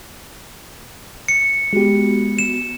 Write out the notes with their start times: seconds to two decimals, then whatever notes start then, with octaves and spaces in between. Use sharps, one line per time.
1.28 C#7
1.73 G#3 B3 F#4 G4
2.39 E7